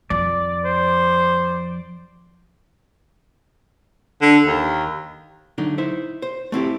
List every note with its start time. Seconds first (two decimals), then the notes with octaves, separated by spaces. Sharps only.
0.10 F2 F3 D5
0.65 C5
4.22 D3
4.46 D#2
5.58 D3 F#3 A3 D4 D#4
5.78 D#4 E4 C5 E5
6.22 C5
6.52 A3 C4 E4 G4